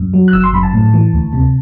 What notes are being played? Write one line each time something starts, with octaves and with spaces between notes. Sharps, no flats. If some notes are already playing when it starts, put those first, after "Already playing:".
Already playing: F#2
F#3
F#6
G1 E6
C6
F#2 B5
A5
A2
E3
D2
C3